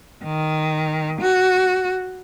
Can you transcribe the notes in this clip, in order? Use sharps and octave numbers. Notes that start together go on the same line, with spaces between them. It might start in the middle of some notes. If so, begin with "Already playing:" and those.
D#3
F#4